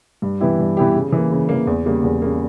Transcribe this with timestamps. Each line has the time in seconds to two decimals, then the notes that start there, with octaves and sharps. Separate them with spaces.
0.22 G2
0.40 E3 B3 E4 G4
0.59 G2
0.77 E3 B3 E4 G4
0.96 C#3
1.12 E3 A#3
1.32 C#3
1.49 E3 A#3
1.67 E2
1.85 C#3 G3 A#3
2.04 E2
2.22 C#3 G3 A#3